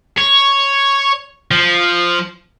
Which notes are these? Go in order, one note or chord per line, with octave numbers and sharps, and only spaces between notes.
C#5
F3